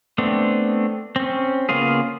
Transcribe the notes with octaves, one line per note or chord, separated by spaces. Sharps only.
A3 B3 C4 D4
C4 C#4
C#3 A#3 B3 F4 G#4